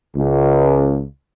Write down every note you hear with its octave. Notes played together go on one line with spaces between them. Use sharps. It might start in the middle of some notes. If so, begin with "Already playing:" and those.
C#2